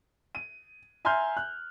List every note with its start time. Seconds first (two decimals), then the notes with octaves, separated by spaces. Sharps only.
0.35 D#7
1.05 E5 G#5 A#5 C6 F6 G6
1.37 F#6